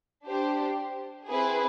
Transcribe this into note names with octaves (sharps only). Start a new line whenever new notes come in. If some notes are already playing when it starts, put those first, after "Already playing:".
D4 G4 C5
C4 E4 G#4 B4